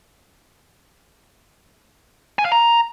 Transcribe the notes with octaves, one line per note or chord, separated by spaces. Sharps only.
G#5
F5
A#5